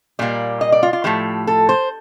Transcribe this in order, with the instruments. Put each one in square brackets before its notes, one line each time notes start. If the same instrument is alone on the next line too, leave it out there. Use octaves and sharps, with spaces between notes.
[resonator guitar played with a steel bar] A#2 G3 A#3 D5
D#5
D5
F4
F4
A2 F3 A3 G4
A4
C5